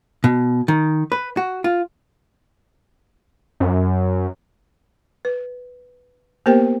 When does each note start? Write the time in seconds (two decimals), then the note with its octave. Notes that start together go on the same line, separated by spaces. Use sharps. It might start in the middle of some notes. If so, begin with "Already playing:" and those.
0.24 B2
0.68 D#3
1.12 B4
1.37 F#4
1.64 F4
3.60 F#2
5.25 B4
6.46 A#3 B3 G4 A#4 C5 G5